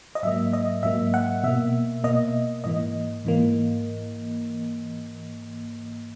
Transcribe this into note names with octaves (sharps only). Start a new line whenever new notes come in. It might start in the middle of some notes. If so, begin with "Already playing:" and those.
D#5
G#2 F#3 A#3 E5
D#5
G#2 F#3 A#3 E5
F#5
B2 A#3 E5
B2 A#3 D#5
G#2 E3 A#3 D#5
G#2 E3 A#3